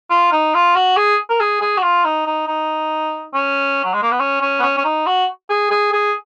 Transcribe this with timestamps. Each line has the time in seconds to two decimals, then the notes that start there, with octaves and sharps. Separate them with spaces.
0.10 F4
0.32 D#4
0.54 F4
0.76 F#4
0.97 G#4
1.29 A#4
1.40 G#4
1.61 G#4
1.78 F#4
1.83 F4
2.04 D#4
2.26 D#4
2.48 D#4
3.34 C#4
3.84 F#3
3.94 G#3
4.03 A#3
4.11 B3
4.20 C#4
4.42 C#4
4.59 B3
4.63 C#4
4.77 C#4
4.85 D#4
5.06 F#4
5.50 G#4
5.71 G#4
5.93 G#4